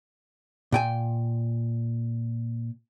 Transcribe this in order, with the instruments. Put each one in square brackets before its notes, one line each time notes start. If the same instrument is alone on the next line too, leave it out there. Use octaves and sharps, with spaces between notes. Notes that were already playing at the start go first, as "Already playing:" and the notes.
[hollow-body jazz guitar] A#2 G5 G#5